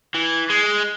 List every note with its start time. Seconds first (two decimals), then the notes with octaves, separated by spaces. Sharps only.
0.15 E3
0.50 G#3